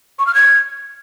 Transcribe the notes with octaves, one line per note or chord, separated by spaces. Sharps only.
C#6
F6
G#6